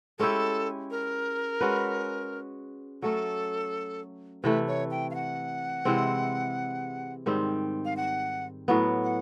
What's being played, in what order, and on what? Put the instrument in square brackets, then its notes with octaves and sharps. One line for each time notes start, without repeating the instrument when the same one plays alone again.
[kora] G#3 C#4 E4 G4 [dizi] A4
[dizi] A#4
[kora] G#3 C#4 F#4 B4
[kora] F#3 A3 C#4 [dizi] A4
[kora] C3 E3 A3 [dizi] B4
[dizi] C#5
G5
F5
F#5
[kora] C3 E3 G#3 C4
G#2 D#3 G3 C4
[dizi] F5
F#5
[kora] A2 F#3 B3
[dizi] F#5